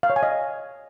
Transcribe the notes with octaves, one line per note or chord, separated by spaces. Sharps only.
F5
C#5
G#5
D#5